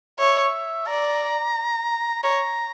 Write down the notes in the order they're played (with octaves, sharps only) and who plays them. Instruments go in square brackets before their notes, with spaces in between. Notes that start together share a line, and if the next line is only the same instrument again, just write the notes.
[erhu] C#5 [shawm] E5
[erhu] D5 [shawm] A#5
[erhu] C#5 [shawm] A#5